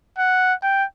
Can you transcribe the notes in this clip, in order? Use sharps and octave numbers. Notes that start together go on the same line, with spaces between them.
F#5
G5